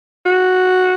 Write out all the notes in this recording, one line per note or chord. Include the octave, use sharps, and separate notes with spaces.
F#4